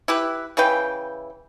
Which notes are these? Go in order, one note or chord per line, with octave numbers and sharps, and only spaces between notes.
E4 G4 B4
C#3 E3 B4 G5